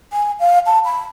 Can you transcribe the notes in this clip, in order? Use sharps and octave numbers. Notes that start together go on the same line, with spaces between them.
G#5
F5
A5
B5